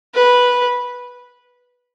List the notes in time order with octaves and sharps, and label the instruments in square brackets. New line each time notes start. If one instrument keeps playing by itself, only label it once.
[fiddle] B4